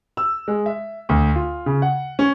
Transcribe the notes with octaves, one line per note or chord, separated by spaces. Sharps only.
E6
G#3
E5
D2
F4
C#3
F#5
C#4